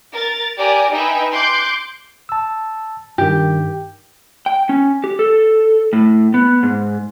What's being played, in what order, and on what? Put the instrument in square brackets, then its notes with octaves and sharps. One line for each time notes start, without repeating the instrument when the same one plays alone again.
[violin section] A#4 A6
G4 A#4 D5 G#5
D#4 B4 E5 G5 G#5 B5
C6 D6 F#6 G6 C7 D7
[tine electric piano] A5 E6
[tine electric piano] G2 D#3 [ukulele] G4
[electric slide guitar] G5
C#4
G4
A4
A2
B3
G#2